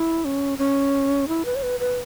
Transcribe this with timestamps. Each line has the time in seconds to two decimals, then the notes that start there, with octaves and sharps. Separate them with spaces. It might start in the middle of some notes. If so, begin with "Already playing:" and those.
Already playing: E4
0.25 C#4
0.58 C#4
1.28 E4
1.45 B4
1.55 C#5
1.63 B4
1.80 B4